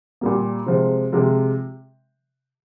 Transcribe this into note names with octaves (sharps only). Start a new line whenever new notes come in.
A#2 G3 A#3
C3 F3 G#3
C3 F3 G#3